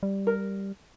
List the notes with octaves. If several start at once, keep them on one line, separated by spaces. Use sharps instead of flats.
G3
A#4